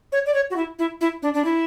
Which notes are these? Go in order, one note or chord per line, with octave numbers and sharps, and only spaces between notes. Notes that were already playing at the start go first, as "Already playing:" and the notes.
C#5
D5
C#5
F#4
E4
E4
E4
D4
D4
E4